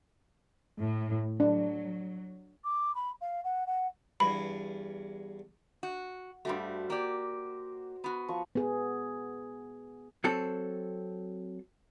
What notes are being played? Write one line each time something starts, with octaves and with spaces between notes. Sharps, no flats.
A2
F#3 D4
D6
B5
F5
F#5
F#5
E2 G2 B5
F#4
G2 G3 A3 F#4 C5
A#3 G4 D5
B3 F#4
F3 C#6
B3 G#4
F#3 C4 A4